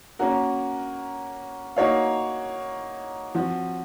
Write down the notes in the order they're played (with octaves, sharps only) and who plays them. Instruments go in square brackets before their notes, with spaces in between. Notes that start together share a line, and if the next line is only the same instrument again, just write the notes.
[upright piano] A#3 C#4 F#4 A#4
A#3 D#4 F#4 C#5 F5
F3 C4 F#4